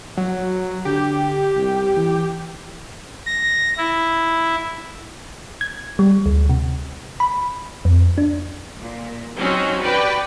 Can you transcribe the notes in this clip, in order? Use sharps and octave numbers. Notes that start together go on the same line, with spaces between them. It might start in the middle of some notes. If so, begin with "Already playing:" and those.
F#3
D3 G4
C2
E3
A#6
E4
G#6
G3
D2
C3
B5
F2
D4
A#2
F#3 C4 C#4 D#4 F#4
F#4 G4 B4 D5 G5